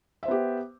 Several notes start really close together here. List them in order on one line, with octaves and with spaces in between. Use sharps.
E5 C5 B3 G4